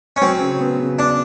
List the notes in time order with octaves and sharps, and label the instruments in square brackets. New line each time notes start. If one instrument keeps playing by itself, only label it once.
[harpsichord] C#4
[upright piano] F#3 [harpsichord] C4
[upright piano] C#3
B3
C#3
[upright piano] B3 [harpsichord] D4